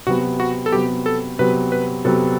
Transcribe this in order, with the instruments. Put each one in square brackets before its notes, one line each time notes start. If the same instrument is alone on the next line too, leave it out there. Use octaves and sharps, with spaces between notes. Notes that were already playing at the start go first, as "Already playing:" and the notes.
[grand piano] C3 F#3 B3 [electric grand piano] F#4
[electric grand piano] F#4
A4
[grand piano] C3 F#3 B3 [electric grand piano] G4
[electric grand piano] A4
[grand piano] C3 F#3 B3 [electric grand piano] B4
[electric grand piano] B4
[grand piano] C3 F#3 B3 [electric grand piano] A4